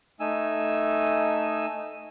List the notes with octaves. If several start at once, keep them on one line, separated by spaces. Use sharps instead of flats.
A3 D#4 G#5 E6